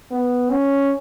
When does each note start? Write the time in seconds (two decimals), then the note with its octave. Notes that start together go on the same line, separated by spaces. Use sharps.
0.11 B3
0.50 C#4